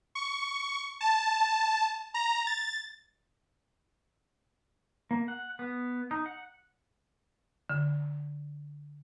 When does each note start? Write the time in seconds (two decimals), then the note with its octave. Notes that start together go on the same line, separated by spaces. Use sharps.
0.15 C#6
1.01 A5
2.14 A#5
2.47 A6
5.11 A#3
5.28 F#5
5.59 B3
6.11 D#4
6.26 F#5
7.70 D3